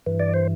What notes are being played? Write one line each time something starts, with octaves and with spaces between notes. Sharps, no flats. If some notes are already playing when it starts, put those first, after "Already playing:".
G2 E3
D5
C5